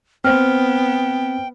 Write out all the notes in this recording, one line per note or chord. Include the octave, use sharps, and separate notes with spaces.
B3 C4 C5 G5 F6